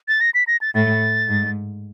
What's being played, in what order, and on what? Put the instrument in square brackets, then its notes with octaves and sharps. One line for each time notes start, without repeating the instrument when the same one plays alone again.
[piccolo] A6
A#6
B6
A#6
A6
[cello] A2 [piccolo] A6
[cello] G#2